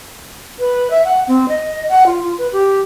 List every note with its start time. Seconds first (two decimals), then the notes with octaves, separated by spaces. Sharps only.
0.59 B4
0.91 E5
1.05 F#5
1.27 C4
1.49 D#5
1.89 F#5
2.06 F4
2.23 F4
2.38 B4
2.53 G4